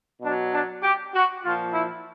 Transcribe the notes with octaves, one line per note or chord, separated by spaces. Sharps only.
B2 F#3 D4
D4
G4
F#4
A#2 F3 F4
E4